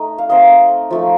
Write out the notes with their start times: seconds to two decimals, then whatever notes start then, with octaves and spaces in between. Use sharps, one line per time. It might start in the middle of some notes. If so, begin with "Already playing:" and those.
Already playing: A3 D#4 D#5
0.18 F5
0.29 A3 C4 D#4 D#5
0.90 F3 A3 D#4